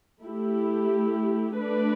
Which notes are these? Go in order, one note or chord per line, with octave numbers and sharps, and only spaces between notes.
A3 E4 G4
A3 D4 B4 D5